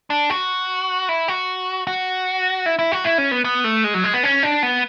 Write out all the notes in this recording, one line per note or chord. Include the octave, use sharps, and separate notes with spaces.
D4
F#4
E4
F#4
F#4
E4
E4
F#4
E4
C#4
B3
B3
A3
G#3
F#3
G#3
B3
C#4
D4
B3